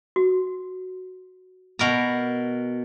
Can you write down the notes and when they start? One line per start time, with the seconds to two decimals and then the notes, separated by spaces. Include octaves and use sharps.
0.16 F#4
1.79 B2 A#4 A#5